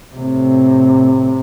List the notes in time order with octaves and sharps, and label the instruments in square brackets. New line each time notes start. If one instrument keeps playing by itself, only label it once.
[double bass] A2 C3